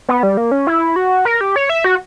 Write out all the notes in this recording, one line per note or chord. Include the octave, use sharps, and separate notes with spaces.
B3
G3
A#3
C#4
E4
F#4
A#4
G4
C#5
E5
F#4